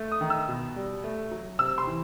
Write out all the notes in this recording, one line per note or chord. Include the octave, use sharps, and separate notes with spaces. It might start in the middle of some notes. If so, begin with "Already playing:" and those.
Already playing: A3
D#6
D#3
E6
B2
G3
A3
F#3
C3 E6
C6
E3